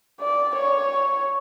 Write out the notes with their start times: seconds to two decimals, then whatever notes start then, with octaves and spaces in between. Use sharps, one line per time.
0.20 D5
0.56 C#5